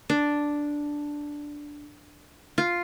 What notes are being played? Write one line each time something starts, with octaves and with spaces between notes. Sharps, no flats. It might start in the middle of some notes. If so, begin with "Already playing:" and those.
D4
F4